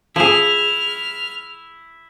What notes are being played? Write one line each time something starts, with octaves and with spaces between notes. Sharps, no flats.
F3 E4 G#4 F6